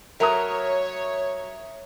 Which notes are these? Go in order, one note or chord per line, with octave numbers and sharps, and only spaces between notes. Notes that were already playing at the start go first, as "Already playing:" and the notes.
F#3 A#4 C#5 E5 A#5 D#6